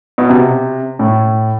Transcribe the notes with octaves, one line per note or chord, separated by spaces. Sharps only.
B2
C3
A2